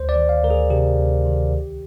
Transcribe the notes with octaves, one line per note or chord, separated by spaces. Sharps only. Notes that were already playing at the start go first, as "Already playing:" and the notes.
Already playing: D2 C5
D5
D#3
F5
D2 A#4
G#4
C3 G4
D2
D#3
C2